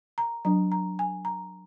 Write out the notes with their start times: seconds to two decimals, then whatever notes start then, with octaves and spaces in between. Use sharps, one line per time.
0.18 A#5
0.45 F#3 D4 A#5
0.72 A#5
0.99 G#5
1.25 A#5